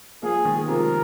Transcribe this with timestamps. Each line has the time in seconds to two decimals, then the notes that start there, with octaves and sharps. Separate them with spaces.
0.23 F3 A#3 G#4
0.45 D#3 G#3
0.68 C3 F3 A#4